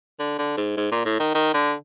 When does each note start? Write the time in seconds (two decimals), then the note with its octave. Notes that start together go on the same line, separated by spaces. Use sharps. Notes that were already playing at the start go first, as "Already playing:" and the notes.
0.19 D3
0.39 D3
0.57 G#2
0.77 G#2
0.92 A#2
1.05 A2
1.20 D#3
1.35 D#3
1.54 D3